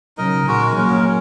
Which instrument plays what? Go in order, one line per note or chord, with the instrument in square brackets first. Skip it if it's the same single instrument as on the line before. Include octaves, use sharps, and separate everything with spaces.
[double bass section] C#3 F#3 [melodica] D#4 A#4 D#5
[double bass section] A#2 D#3 [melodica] G#3 F#4 A#4
[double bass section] F#3 A#3 [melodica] G#3 C#4 A#4
[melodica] C#4